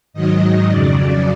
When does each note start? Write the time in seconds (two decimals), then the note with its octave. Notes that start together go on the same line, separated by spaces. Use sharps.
0.13 G#2 D#3 F#3 D#5
0.68 F2 C#3 F#3 D5